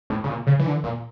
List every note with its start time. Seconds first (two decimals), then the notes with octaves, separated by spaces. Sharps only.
0.10 A2
0.24 C#3
0.29 A#2
0.47 C#3
0.59 E3
0.66 D3
0.84 A#2